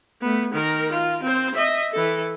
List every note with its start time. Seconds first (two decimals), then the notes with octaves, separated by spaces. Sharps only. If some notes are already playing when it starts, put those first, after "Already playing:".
0.21 A3 B3
0.53 D#3 A#4
0.92 F4
1.23 C4 C5
1.55 D#5 E5
1.93 E3 A4